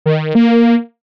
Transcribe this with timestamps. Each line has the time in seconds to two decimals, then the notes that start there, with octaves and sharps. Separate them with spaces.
0.06 D#3
0.35 A#3